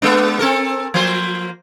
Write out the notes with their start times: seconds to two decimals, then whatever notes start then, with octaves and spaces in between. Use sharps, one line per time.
0.02 G#3 B3 D4
0.39 C4 A4 A#4
0.94 F3 A#3 C5